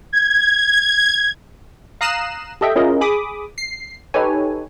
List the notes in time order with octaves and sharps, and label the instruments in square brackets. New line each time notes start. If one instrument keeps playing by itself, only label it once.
[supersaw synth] G#6
[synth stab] F5 A#5 D#6 F#6 C7 E7
G4 A4 D#5 E5 G5
C#4 E4 F4 G#4 A#4 D#5
G#4 B5 D6 D#6
C7
D#4 G4 A4 B4 C#5 G#5